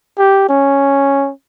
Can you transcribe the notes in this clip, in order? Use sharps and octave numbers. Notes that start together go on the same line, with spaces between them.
G4
C#4